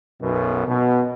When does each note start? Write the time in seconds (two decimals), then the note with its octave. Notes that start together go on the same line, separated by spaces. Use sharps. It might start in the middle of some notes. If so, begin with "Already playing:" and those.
0.22 B1 F#2 B2
0.67 B2